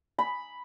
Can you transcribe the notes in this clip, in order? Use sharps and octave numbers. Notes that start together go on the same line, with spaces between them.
B5